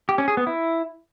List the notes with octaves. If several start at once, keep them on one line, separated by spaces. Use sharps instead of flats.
G4
C#4
G#4
B3
E4